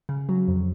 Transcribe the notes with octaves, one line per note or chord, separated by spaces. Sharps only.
C#3
F#3
F2